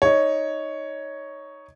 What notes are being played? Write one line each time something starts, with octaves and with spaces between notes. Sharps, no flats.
D#4 C#5